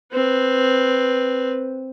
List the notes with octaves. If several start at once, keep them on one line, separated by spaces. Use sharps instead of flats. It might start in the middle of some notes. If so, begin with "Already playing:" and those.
C4 B4